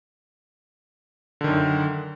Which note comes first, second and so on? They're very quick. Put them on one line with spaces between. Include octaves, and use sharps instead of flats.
D3 D#3 F#2